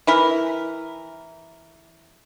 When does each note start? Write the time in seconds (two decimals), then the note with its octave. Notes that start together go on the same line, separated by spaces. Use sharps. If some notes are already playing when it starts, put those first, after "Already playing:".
0.07 E3 E4 A#4